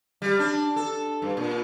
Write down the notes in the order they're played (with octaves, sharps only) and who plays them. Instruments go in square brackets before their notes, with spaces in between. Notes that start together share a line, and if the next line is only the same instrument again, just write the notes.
[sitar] G3
D4
A4
G2
A#2